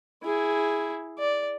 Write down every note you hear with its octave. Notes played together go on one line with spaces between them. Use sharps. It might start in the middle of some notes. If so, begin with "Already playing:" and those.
E4 G#4
D5